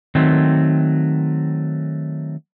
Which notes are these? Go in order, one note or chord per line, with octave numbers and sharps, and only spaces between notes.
D#3 F#3 A3 C4